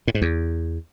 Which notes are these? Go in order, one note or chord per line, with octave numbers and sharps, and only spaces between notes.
A2
G#2
E2